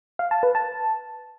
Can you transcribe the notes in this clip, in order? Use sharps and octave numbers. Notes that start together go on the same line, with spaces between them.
F5
A5
B4
A5